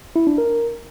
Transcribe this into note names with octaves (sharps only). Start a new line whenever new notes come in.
E4
D4
A#4